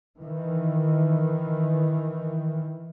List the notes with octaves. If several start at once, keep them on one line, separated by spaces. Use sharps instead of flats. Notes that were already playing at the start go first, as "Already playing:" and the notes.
D#3 E3